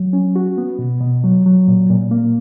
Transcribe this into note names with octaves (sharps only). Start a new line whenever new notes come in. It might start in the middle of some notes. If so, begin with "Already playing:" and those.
Already playing: F#3
C#4
F#4
B3
B2
B2
F#3
F#3
A#2
A#2
A#3